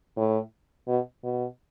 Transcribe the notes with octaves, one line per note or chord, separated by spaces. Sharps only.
A2
B2
B2